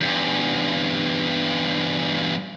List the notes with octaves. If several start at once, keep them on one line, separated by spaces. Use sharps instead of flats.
E2 G2